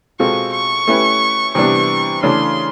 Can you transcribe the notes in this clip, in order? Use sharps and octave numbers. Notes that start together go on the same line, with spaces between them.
B2 G#3 C4 F4 A4 C#6
C#6
A3 C#4 E4 G4 B4
C3 E3 G3 B3 D4 C#6
C#3 E3 A3 D4 C6